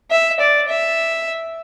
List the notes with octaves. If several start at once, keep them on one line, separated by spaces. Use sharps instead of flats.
E5
D5
E5